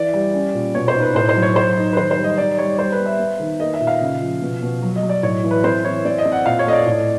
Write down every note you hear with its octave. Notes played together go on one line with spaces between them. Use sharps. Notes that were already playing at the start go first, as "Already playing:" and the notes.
Already playing: E3 D5
G3
C#4
A#2
B2 C#5
C5
D#4
B4
A2 C5
C5
F#3
C#5
F#3 C5
D#4
B4
D#3 C5
C5
G3
D#5
D#4 D5
G3 C#5
G3 C5
B4
B3
E5
B3
D#3
A#3 D#5
E5
A#2
F5
C#3
F3
B2
B2
F#3
D#5
F#3
D5
A2 C#5
E3
B4
C4 C5
E3 C#5
C4 D5
D#5
C4
F#5
A#2 F5
C#5
A3 D#5
D5
A2